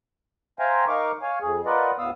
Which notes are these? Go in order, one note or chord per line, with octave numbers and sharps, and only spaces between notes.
C5 E5 F5 G5 G#5 A#5
D#4 A#4 F5 C#6 D6
C#5 F5 G#5
F2 G#4
F4 A#4 B4 D5 D#5 F#5
D2 A2 B3 F5 D#6 E6